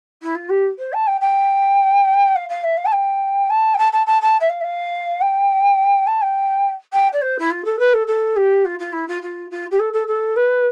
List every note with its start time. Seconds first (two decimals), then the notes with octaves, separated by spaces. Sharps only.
0.22 E4
0.35 F4
0.49 G4
0.78 C5
0.93 A5
1.07 G5
1.21 G5
2.35 F5
2.49 F5
2.64 E5
2.77 F5
2.85 A5
2.92 G5
3.50 A5
3.74 G5
3.78 A5
3.92 A5
4.06 A5
4.22 A5
4.40 E5
4.49 F5
4.61 E5
4.64 F5
5.21 G5
6.07 A5
6.22 G5
6.93 G5
7.12 D5
7.21 C5
7.39 E4
7.51 F4
7.65 A4
7.79 B4
7.93 A4
8.07 A4
8.36 G4
8.65 F4
8.79 F4
8.92 E4
9.08 F4
9.22 F4
9.51 F4
9.71 G4
9.79 A4
9.93 A4
10.07 A4
10.36 B4